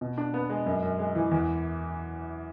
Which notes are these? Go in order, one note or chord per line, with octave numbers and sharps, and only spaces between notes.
B2
D4
B3
G#3
F#2
F#2
G#3
E3
E2